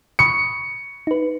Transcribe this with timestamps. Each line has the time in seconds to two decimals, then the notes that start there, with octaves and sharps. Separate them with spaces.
0.19 B5 C#6 D#6 C#7
1.07 D#4 B4